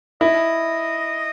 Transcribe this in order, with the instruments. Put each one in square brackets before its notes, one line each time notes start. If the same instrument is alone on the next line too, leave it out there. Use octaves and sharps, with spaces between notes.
[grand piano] E4 [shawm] D#5